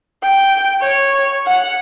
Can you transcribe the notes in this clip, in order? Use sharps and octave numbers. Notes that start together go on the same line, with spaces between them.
G5
C#5
F#5